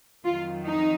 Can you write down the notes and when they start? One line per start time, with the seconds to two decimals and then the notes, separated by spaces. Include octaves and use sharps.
0.24 F2 D#3 F#3 F4
0.65 D#4